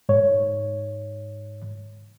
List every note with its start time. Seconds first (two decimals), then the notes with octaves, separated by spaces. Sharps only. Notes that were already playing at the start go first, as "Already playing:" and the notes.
0.09 G#2 C#5